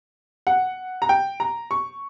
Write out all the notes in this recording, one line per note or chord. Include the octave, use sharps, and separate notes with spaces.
F#5
A#5
G5
A#5
C#6